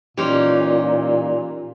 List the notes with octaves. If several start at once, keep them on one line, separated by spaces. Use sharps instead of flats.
A#2 E3 C#4 D#4 G4 C6 D6